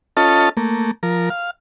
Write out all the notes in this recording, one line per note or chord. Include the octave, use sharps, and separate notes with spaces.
C#4 F4 A4 D#5 A5
A3 A#3
F3 A#4
F5